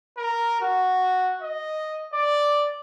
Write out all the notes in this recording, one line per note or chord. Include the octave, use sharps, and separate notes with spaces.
A#4
F#4
D#5
D5